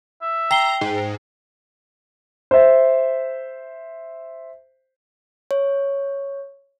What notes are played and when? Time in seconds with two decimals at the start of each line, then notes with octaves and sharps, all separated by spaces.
0.21 E5
0.51 G5 A#5 C7 G7
0.81 G#2
2.51 C5 E5
5.51 C#5